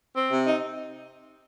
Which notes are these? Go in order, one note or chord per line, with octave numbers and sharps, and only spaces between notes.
C4
C3
D#4